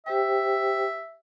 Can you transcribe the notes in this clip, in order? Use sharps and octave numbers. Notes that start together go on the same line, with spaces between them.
G4 C5 E5 G5